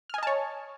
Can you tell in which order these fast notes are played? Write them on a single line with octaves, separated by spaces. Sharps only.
F6 G#5 D#5 A5 C#5